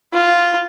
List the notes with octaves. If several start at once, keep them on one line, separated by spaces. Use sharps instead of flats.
F4